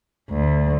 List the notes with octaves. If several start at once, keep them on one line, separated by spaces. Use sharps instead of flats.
D2